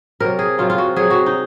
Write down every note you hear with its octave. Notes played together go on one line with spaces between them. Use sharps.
C3 F#3 A#4
G#4
C3 F#3 F4
F4
F#4
C3 F#3 G#4
F#4
D#4